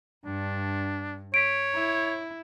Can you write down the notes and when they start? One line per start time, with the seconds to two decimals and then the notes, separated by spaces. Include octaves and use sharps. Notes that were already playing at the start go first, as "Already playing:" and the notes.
0.25 G2 D4
1.34 C#5 B6 D7
1.74 E4